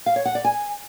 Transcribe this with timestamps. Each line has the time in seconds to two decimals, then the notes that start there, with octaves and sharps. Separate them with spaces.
0.06 F5
0.16 C#5
0.25 F#5
0.35 D5
0.45 G#5